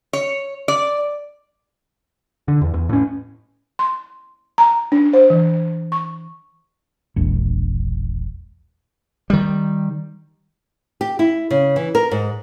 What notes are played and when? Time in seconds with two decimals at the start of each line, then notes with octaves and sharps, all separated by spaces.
0.13 C#5
0.68 D5
2.48 D3
2.61 E2
2.74 E2
2.89 A2 C#4
3.79 C6
4.58 A#5
4.92 D4
5.13 C5
5.30 E3
5.92 C#6
7.16 E1 A#1
9.30 D#3 G3
11.01 G4
11.19 E4
11.51 C#3
11.76 E3
11.95 A#4
12.11 G#2